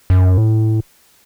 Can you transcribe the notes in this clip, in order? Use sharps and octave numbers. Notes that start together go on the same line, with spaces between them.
F#2
A2